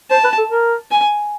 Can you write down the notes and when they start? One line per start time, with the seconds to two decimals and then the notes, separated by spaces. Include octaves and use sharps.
0.11 C5 A5
0.24 B4
0.38 A4
0.50 A#4
0.91 G#5